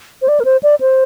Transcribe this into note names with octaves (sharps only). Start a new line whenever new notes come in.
C5
D5
A#4
C5
D5
C5